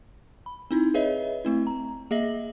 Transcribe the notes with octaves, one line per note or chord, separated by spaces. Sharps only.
B5
C4 D#4 E4
G#4 B4 C#5 D#5 E5
A3 C4 E4
A#5
A#3 G#4 D#5 E5 A#6 F#7